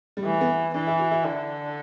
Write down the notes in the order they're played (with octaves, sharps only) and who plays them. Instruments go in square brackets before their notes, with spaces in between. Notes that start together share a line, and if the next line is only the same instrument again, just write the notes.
[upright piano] G3
[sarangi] E3 [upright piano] A3
[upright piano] B3
[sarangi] E3 [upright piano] D4
[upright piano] E4
F#4
E4
[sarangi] D3